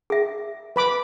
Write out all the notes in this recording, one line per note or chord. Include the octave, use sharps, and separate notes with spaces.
G#4 E5
B4 B5 D6